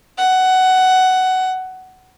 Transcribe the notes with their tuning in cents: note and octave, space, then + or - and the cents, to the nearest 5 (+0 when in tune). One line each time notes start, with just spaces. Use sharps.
F#5 +15